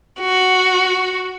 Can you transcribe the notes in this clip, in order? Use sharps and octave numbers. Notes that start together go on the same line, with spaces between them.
F#4